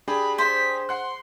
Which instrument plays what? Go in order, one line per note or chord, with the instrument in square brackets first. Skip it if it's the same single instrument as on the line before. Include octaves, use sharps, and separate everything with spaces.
[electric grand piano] D4 G4 G#4 [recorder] B5
[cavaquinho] C5 [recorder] B6
[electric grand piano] F#5 F#6 [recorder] C6